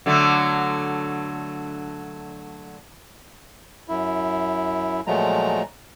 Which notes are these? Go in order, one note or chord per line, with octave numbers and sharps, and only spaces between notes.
D3 F#3 A3
F#2 E4
A#2 F3 F#3 G#3 A3 A#5